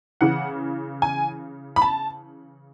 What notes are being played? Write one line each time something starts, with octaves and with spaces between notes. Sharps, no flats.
C#3 E3 F#5
G#5
B5
A5